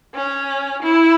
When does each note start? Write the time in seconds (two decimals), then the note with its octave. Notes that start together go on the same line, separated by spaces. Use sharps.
0.14 C#4
0.82 E4